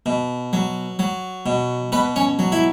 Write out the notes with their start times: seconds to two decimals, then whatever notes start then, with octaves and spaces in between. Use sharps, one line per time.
0.06 B2
0.53 F#3
0.99 F#3
1.46 B2
1.92 B2 B4
2.16 C#4
2.39 F#3
2.52 E4